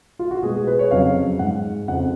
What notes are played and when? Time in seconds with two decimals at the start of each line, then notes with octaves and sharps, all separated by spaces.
0.19 F4
0.31 F#4
0.43 B2 G#3 G#4
0.55 G#4
0.67 B4
0.79 C#5
0.91 F2 C#3 F#3 F5
1.39 G#2 G#3 F#5
1.88 F2 C#3 F3 F#5